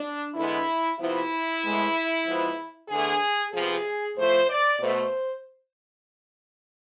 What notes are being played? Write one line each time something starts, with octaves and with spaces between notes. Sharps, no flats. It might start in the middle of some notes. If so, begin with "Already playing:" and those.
Already playing: D4
E2 D3 G#3 B3 E4
C3 F3 B3 E4
A2 G#3 B3
G#2 F3 B3
E2 D3 A3 G#4
C3 F3 B3 G#4
A2 F3 A3 C5
D5
B2 A3 C5